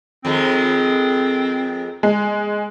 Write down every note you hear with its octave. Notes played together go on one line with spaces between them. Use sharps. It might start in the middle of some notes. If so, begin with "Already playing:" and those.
F2 D#3 G#3 C4
G#3